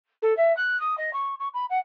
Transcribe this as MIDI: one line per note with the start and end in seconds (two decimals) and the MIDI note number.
0.22 0.35 69
0.36 0.54 76
0.56 0.79 90
0.80 0.96 87
0.97 1.13 75
1.13 1.34 85
1.39 1.48 85
1.53 1.65 83
1.69 1.78 78